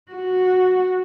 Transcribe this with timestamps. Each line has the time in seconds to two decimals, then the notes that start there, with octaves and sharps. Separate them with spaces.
0.11 F#4